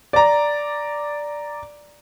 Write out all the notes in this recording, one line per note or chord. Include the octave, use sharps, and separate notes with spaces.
D5 A#5